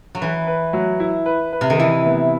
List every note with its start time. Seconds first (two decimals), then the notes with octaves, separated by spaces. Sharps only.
0.15 F#3
0.21 E3 B4
0.47 B4
0.73 F#3
1.00 E4
1.26 B4
1.53 B4
1.61 C3
1.70 D#3
1.79 E3 E4
2.06 B3